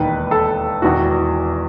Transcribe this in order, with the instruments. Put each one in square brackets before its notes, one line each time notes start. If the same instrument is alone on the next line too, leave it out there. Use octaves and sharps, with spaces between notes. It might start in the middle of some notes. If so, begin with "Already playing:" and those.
Already playing: [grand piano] E1 D#2 D#3 B4
A4
E1 E2 D#3 F#4